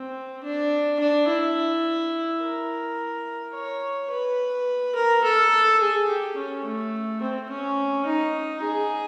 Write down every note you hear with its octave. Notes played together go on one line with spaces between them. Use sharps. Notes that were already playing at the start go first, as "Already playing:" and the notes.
Already playing: C4
D4
D4
E4
A#4
C#5
B4
A#4
A4
G#4
G4
C#4
A3
C4
C#4
D#4
G#4